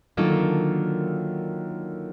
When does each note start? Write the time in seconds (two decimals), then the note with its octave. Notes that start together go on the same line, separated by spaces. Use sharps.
0.17 D#3 F#3 A#3 D4 F4 A4
0.30 D3
0.42 D#3